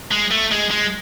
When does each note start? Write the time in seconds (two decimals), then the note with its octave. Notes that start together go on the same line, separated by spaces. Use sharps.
0.11 G#3
0.31 A3
0.52 G#3
0.71 G#3